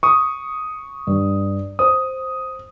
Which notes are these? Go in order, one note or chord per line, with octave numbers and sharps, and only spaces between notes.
C#6 D#6
G2
C5 D#6